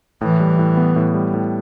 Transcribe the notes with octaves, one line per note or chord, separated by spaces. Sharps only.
A2 E3
G3
A2
B3
A2
G3
A2